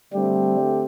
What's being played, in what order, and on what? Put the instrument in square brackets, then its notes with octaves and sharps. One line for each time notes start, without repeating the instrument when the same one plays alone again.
[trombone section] D3 A3 C4 G4 [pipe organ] G3